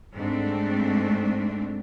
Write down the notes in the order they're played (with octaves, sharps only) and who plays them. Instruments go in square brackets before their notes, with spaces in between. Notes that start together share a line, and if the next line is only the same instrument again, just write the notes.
[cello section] G#2 G3 A3 C4 D4